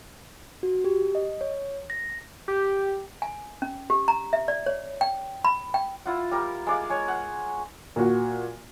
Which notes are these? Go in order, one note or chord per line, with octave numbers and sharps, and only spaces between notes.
F#4
G4
D#5
C#5
A#6
G4
G#5
C#4
G4
A#5
E5
D5
C#5
G5
B5
G5
E4 F4 F#5
G3 A#4
G#3 D5 F5
G#3 C#5
F#5
A#2 F#4